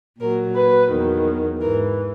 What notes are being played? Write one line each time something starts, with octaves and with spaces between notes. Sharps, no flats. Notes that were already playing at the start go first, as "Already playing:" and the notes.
A#2 F#3 A#4
B4
E2 D#3 F#3
G#2 E3 A#4